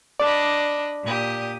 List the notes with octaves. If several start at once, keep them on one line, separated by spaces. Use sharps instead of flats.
D4 D5 D#5 B5
A#2 G4 D#6